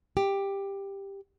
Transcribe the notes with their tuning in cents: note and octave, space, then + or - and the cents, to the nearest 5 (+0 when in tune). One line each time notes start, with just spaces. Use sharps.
G4 +10